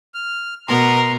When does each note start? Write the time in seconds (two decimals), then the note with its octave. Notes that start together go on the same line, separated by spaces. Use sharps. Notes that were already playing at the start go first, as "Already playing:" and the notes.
0.14 F6
0.68 B2 B3 A#4 A#5 C6